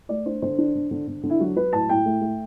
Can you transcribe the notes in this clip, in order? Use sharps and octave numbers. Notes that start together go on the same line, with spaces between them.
A3 D5
D4 C5
D3 C5
D4
D3
D3
D3
D3
E4
F#3 F#4
F#3 B4
A2 A5
A2 G5
A3
A3